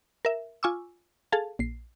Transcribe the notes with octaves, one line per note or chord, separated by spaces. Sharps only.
A#4 E5
F4 G#5 C#6 D6 E6
G#4 A4 F5 A5
A#1 C7